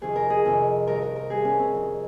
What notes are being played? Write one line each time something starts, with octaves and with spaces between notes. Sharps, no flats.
F2 C3 D#3 G#4
A#4
G#4
F2 C3 D#3
G2 D#3 A#4
A#4
A#4
G2 D#3 G#4
C#4
C4
F2 C3 D#3